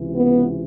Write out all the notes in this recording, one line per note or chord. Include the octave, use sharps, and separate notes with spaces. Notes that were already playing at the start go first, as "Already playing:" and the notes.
Already playing: C#2 C3 E3
B3